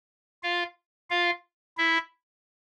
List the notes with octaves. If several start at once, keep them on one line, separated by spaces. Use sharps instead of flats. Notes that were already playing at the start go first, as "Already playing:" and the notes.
F4 F5
F4 F5
E4 E5